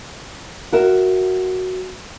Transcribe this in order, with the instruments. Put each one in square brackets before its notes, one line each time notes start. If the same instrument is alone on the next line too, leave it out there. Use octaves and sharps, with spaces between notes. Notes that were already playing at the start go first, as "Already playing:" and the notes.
[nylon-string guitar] F#4 A#4 E5